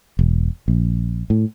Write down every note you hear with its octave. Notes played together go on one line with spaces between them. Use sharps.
E1
A#1
A2